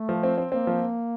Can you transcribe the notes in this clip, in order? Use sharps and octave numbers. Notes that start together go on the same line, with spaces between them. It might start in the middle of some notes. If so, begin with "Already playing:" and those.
Already playing: A3
F3
C4
C4
A#3 C4
F3